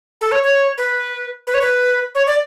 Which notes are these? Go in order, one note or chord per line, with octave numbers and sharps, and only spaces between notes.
A4
C#5
C#5
B4
B4
C#5
B4
C#5
D5